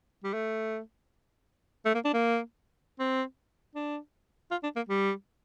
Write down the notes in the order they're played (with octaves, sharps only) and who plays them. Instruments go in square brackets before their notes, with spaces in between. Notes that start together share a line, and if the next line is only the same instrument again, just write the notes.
[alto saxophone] G3
A3
A3
A#3
D4
A#3
C4
D4
F4
D4
A#3
G3